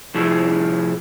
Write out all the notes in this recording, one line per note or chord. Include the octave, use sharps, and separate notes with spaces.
A2 C3 F3 E4 G#4